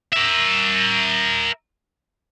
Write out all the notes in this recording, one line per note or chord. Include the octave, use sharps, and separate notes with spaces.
A#4 E5